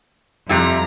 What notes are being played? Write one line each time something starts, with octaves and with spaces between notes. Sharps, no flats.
F2 C3 G3 E4 A#5